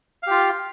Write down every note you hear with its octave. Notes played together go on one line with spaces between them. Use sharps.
F4 G4 F5